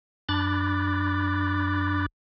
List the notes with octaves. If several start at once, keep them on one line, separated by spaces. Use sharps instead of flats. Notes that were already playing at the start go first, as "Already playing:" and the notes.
F#2 D4 B5 D6 F#6 A6